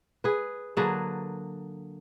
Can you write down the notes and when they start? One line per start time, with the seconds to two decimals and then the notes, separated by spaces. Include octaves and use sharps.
0.24 G#4 B4
0.77 D3 F#3 A#3 G#4 B4